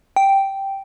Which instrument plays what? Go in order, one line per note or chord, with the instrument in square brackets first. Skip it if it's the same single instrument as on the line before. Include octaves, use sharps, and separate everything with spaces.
[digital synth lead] G5